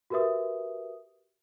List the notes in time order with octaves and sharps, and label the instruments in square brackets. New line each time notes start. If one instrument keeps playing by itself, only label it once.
[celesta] F#4 G4 A#4 B4 E5 D#6